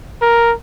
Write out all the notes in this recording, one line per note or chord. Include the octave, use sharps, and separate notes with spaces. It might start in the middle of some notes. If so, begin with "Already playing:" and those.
A#4